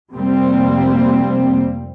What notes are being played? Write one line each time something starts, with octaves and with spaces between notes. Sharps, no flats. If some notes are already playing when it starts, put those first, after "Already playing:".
F1 C3 G3 A#3 C4